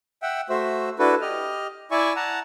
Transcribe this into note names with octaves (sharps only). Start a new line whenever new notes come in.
E5 F#5 G5
A3 F#4 C5 E5
D4 E4 F#4 A4 B4
G4 D#5 F6
E4 D5 E5 G#5 C#6
F#5 A5 A#5